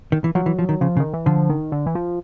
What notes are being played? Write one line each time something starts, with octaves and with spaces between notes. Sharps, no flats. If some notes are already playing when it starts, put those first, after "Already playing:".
D#3
E3
F3 F#3
E3
F3
D#3
C#3 F3
C#3
D#3
E3
D3 F3
D#3
D3
E3
F3